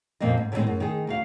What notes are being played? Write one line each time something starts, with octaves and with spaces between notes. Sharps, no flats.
F2 A#2 A#3 C4 D#5
G#2
A2 D3 D#3 G3 G#3 C4
F#2
D#3 G#4
D2 F#4 F5